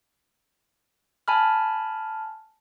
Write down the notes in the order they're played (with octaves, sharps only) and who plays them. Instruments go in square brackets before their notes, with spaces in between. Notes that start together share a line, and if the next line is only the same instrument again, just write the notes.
[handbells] G#5 A5 B5 F6